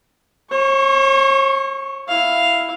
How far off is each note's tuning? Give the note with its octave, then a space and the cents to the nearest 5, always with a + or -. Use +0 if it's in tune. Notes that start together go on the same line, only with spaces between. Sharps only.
C#5 -45 C#6 +0
E4 +0 F5 +0